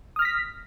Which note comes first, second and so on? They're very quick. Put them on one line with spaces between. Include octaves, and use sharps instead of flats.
D#6 F6 A#6 B6